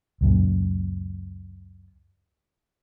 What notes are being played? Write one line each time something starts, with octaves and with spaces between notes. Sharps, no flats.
C#2 F#2 A#2